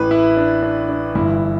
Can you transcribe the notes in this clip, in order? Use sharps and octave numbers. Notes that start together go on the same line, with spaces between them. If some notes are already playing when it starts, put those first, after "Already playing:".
Already playing: A1 A2 E3 B4
E4
D4
D4
D4
G1 G2 E3 E4